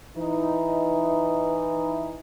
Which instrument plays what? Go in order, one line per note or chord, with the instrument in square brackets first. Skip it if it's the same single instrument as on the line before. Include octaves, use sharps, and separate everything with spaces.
[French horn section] E3 D#4